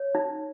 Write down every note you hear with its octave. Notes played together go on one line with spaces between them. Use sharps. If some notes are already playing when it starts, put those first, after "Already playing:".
Already playing: C#5
D#4